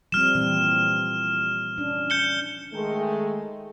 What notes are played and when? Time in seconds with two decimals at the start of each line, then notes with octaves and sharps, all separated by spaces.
0.12 F3 G3 C4 F6 E7
0.35 A#2 E3 C4
1.78 C#4 D4
2.10 G6 C#7 G7
2.74 D#3 G#3 A3